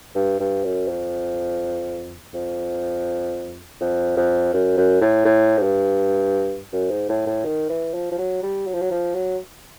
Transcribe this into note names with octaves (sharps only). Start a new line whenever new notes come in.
G2
G2
F#2
F2
F2
F2
F2
F#2
F#2
A2
A2
G#2
G2
F#2
G#2
A2
A2
D#3
E3
F3
F3
F#3
G3
F#3
F3
F#3
F3
F#3